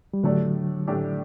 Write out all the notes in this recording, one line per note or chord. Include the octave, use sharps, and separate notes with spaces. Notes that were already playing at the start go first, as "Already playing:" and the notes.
G3
A2 D3 F#3 A3 D4 G4 D5
A2 A3 D4 G4 D5